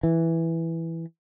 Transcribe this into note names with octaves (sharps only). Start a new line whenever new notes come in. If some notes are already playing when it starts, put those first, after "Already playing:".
E3